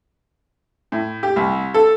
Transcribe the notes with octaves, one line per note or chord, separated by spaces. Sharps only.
A2
G4
C2
A4